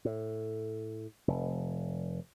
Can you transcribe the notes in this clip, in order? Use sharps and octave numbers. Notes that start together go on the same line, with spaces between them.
A2
F1